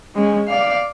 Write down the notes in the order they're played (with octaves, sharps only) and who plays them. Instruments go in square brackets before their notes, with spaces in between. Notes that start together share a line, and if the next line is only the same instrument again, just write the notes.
[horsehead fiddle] G#3 C#4
D5 F5